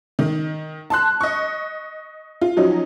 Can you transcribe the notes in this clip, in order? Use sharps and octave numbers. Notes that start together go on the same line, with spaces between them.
D#3
A5 C6 F#6
D#5 C#6
F4
F3 F#3 C#4 D#4